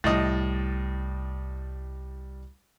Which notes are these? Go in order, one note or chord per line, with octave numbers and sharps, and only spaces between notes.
C2 A2 G3 D#5 F6 A6